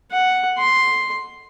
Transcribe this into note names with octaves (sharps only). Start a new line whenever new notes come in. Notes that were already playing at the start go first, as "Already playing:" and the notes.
F#5
C6